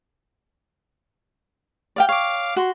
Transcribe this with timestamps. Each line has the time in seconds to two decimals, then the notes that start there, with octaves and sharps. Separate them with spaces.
1.96 D5 F5 G5
2.09 C#5 F5 D6
2.56 F#4 C6